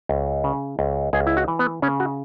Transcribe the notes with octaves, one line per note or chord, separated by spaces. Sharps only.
C#2
C#3
C#2
C#2 G#4
E4
F#4
E3
B3
C#3 C#4
F#4